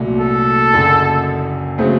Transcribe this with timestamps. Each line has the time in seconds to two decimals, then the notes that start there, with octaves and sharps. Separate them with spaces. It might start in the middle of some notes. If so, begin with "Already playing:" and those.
Already playing: C2 A#2 F#3 A3
0.20 A4
0.73 F#1 F#2 D3
1.78 C#3 F#3 A3 C4